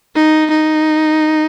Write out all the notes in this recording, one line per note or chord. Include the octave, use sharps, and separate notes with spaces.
D#4
D#4